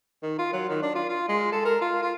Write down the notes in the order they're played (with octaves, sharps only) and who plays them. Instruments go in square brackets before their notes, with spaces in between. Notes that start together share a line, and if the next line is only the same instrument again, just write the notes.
[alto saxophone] D#3
F4
F#3
D#3
D4
F4
F4
G#3
A4
A#4
F4
F4